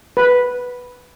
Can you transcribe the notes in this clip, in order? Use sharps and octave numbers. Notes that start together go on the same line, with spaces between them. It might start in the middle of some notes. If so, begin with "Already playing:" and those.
B4